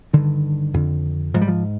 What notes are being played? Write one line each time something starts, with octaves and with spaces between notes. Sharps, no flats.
G2 D3 D#3
F2 D3
G#2 F3
G3
F3